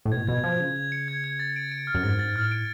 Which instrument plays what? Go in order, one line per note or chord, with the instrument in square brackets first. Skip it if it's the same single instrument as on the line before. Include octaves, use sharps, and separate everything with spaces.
[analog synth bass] A2
[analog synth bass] B2 [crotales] G#6
[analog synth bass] A2
[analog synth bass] B2 [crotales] G#6
[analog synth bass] F3 [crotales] G#6
[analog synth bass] C#3 [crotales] G#6
[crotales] G#6
C#7
G#6
G#6
A6
D7
D7
F6
[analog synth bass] F#2
[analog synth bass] G#2 [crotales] A6
[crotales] A6
[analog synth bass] A2 [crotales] F6
[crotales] D7